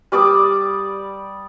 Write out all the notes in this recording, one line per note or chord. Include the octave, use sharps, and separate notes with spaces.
G3 D5 D6 D#6